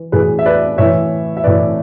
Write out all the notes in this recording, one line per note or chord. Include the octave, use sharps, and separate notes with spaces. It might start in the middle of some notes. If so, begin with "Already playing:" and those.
Already playing: E3
A2 E3 G#4 B4
E5
B4 D5
A2 E3 C#5 E5
E5
A2 E3 B4 D5